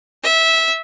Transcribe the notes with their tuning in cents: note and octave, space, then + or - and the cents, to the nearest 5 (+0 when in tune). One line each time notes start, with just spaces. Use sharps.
E5 -15